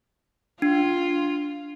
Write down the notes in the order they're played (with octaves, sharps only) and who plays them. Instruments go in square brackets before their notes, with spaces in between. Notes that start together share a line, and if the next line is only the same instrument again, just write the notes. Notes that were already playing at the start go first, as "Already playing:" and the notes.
[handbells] D4 [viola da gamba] F4